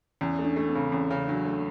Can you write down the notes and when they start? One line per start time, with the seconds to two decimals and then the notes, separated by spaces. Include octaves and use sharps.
0.21 E2 C#4
0.39 A3
0.45 D4
0.56 A3
0.68 C4
0.75 C#3
0.92 E2 C#4
1.11 C#3
1.28 F#3 D4
1.46 A3